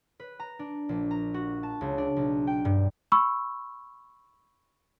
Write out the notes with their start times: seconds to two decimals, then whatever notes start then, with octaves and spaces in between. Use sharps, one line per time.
0.20 B4
0.40 A#5
0.59 D4
0.89 A#1
1.11 A#5
1.34 F#4
1.63 A5
1.81 C#2
1.98 D4
2.16 B1
2.47 G5
2.65 G2
3.12 B5 C#6 E6